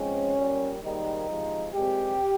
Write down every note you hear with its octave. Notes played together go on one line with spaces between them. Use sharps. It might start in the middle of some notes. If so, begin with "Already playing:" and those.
Already playing: G#2 F3 G#3 C4 C#4
A#2 G3 A#3
G#2 D#3 G3 A#3 D#4
C3 F3 G#3
A#2 G#3 C4 G4